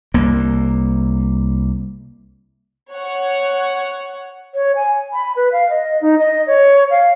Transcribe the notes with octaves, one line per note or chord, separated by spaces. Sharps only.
C2 A#3
C#5 F#5
C#5
G#5
B5
B4
F5
D#5
D#4
D#5
C#5
F5